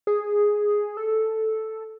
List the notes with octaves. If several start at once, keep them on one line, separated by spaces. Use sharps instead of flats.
G#4
A4